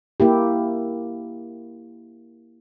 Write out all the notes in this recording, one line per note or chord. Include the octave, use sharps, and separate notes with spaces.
A#3 E4 G4